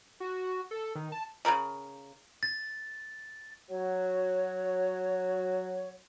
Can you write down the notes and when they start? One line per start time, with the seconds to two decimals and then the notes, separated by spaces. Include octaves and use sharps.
0.20 F#4
0.71 A4
0.95 D#3
1.12 A5
1.45 C#3 A3 A#4 B5
2.43 A6
3.70 F#3 F#4 C#5